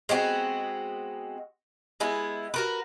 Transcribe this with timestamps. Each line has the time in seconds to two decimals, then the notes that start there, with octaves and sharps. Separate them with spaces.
0.09 G#3 B3 C4 F#4
2.00 G#3 B3 E4
2.54 F#4 A#4 B4